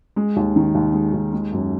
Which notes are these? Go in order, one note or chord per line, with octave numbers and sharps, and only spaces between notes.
G#3
D#2
D#3
D#2
G#3
D#2
G#3
F#2